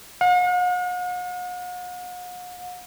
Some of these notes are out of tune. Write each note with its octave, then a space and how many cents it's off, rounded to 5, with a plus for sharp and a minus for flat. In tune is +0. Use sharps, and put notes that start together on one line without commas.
F#5 -45